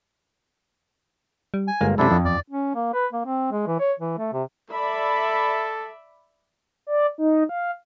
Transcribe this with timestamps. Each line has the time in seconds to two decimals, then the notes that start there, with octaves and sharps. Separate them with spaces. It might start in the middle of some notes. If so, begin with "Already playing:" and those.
1.54 G3
1.68 G#5
1.81 G1 G#3 A#3
1.98 F#2 C3 D4 E4 A4
2.11 F2 F3
2.25 E2 D5
2.49 C#4
2.75 A#3
2.93 B4
3.13 A#3
3.25 C4
3.51 G#3
3.67 E3
3.79 C#5
3.99 E3
4.18 A3
4.33 C3
4.70 A4 D5 E5 B5
6.87 D5
7.18 D#4
7.49 F5